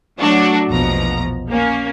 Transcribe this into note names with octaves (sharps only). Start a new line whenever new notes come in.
F#3 A3 D4 F#4
A#1 E2 B2 F3 A#5
A#3 C#4